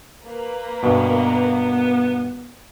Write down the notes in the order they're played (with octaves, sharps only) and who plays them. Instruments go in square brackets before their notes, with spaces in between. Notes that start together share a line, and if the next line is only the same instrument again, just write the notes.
[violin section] A#3 A#4 B4
[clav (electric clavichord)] G2 B2 [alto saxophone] B3